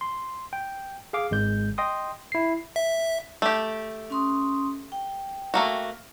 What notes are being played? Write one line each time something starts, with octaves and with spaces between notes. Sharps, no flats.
C6
G5
G#4 F5 D6
G#1 G#3 G6
D#5 G5 C6 D#6
E4 C7
E5
A3 G4
C#4 C6 D#6
G5
A3 A#3 F#4